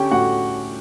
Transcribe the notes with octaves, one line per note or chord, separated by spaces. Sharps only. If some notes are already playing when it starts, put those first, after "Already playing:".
Already playing: D3 C#4 G4 G5
A2 F#4 F#5